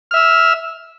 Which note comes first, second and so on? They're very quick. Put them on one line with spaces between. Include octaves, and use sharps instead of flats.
F6 E5 E6